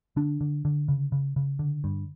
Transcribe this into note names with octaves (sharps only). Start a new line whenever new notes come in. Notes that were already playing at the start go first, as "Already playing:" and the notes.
D3 D4
D3
D3
C#3
C#3
C#3
D3
G2